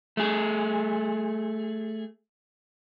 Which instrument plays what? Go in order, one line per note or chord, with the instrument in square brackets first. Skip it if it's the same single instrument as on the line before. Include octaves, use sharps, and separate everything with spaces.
[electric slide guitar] A3 G#4